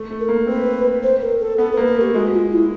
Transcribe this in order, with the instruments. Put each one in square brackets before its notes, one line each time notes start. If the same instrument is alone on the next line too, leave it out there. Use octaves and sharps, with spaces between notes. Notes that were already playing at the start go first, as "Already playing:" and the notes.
Already playing: [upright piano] A3
A3
[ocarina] A#4
[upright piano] A#3
[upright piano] C4 [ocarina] B4
[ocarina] C5
A#4
A4
[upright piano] B3 [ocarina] A4
[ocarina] B4
[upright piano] A#3
[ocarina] A#4
[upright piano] A3 [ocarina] G4
[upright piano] G#3 [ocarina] F#4
[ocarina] F4
E4